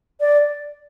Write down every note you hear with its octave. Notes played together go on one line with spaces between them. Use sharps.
D5